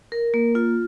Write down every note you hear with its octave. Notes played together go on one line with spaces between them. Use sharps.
A#4
A#3
F4